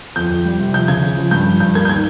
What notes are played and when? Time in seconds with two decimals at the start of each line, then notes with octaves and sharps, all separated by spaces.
0.16 F2 G6
0.30 F2
0.45 G3
0.60 C3
0.73 F3 G6
0.88 C#3 G#6
1.02 C#3
1.17 F3
1.31 G2 G6
1.46 F3
1.60 G2 G6
1.75 A#3 G#6
1.85 G6
1.89 D#3 G#6